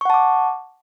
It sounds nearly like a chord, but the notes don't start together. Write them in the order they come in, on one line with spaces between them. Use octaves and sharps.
C#6 F#5 A5 D6